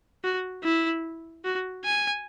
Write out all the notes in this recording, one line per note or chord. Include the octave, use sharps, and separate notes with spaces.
F#4
E4
F#4
G#5